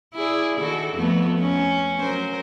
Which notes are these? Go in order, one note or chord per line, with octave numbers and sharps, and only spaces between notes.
E4 G#4 D5
D#3 F#4 A4
F2 A3 B3
C#4
F#3 A#4 C5